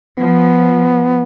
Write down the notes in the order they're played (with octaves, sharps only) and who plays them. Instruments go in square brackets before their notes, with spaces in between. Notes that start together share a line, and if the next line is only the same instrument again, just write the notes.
[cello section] F3 [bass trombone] B3